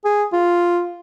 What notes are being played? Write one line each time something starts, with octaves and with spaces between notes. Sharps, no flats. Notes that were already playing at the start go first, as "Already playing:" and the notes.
G#4
F4